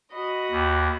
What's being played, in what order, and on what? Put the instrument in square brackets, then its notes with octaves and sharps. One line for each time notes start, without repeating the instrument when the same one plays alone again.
[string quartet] F#4 D#5 B5
[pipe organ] D#2